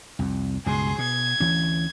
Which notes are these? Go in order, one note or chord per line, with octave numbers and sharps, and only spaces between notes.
C2 F2
C#2 G2 B2 G#4 C6
B2 G#6
D2 E3 C#4